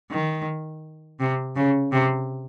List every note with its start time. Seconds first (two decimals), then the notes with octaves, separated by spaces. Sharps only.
0.11 D#3
1.20 C3
1.56 C#3
1.92 C3